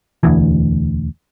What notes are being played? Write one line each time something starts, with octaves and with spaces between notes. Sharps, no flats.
E1 D2 E3